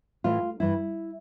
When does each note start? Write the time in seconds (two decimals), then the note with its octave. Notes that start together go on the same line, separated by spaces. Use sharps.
0.24 A2 E3 F4
0.60 G2 E3 E4